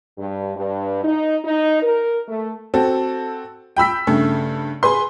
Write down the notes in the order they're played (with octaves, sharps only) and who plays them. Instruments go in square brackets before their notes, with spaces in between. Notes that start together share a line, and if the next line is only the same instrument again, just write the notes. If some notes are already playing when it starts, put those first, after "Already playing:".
[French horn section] G2
G2
D#4
D#4
A#4
A3
[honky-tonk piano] C4 F#4 A4
G5 B5 E6 B6
G2 C#3 A3
G#4 B4 C6